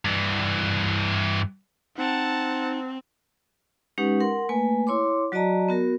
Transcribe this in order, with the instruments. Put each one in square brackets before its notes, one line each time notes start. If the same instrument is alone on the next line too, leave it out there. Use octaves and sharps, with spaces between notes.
[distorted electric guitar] G2 E3
[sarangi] C4 [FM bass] D#4 [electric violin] F#5 A5
[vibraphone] G#3 C#4 D#4 G4 B4 F#5
A#4 F#5 C6
A3 A#3 B4 G#5
E4 C#5 C6 D6
F#3 F#4 D5 D#5 A5 A#5
B3 F#4 A#4